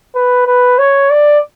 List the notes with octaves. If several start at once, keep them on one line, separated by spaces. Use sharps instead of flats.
B4
B4
C#5
D5